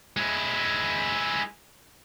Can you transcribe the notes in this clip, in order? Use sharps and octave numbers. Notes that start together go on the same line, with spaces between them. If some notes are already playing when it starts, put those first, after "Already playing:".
G#3 E4